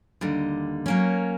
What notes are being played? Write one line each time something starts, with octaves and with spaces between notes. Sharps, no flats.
D#2 D3 G3
F#3 A#3 C#4